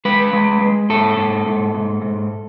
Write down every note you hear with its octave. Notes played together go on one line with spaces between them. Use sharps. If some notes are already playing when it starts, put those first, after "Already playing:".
G#3 B4
G#3
G#3
G#2 A4
G#2
G#2
G#2
G#2